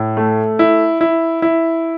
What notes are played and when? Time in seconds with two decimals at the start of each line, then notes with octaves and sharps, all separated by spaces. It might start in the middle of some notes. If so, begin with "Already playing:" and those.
Already playing: A2
0.17 A3
0.59 E4
1.01 E4
1.42 E4